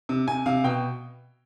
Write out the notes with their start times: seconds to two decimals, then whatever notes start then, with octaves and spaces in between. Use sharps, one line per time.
0.09 C3
0.28 C3 G#5
0.46 C3 F5
0.64 B2 G5